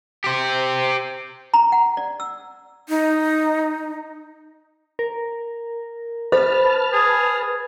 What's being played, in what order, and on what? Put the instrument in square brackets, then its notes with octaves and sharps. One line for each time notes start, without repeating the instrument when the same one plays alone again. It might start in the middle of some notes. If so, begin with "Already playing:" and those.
[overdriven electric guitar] G4 C5
[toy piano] A#5
F#5
D5
E6
[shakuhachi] D#4
[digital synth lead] A#4
[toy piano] A4 C5 [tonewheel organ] B4 A5 F6 [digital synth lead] B5
[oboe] G#4